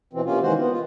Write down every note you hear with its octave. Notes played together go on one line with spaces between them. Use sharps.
B2 E3 C4
C3 A#3 C#4 F4
D#3 E3 G#3 F#4 C5
B3
F4